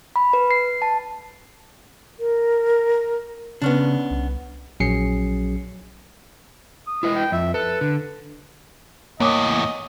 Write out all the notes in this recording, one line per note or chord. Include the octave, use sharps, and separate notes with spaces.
B5
B4
C7
A5
A#4
C#3 B3 C#4 D4
C2
A#1 F#3 C#4 G#4 C7 C#7
D#6
E4 B4 D#5
G5
F2 E5
A4 B4
D3
E2 A2 A#3 C#5 D#5 D6 D#6